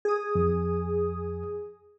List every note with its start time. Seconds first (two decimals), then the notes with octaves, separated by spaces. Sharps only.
0.05 G#4 D#6
0.35 F2